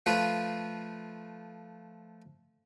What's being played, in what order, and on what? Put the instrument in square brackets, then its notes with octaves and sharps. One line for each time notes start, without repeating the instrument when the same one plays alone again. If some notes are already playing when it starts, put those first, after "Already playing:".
[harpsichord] F3 A3 F4 B4